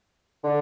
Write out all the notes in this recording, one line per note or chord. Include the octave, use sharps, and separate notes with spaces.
D3